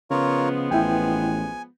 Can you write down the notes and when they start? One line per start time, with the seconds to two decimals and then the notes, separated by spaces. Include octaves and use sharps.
0.11 C#3 F3 G#3 B3 F4 A#4 C#5
0.71 A1 E4 G5 G#5